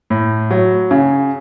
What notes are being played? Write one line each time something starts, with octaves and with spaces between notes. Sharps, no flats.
A2
F#3
C#3